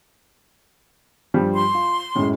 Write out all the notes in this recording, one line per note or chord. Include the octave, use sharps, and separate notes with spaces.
G2 F3 G3
C6
F4
F#2 A2 G#3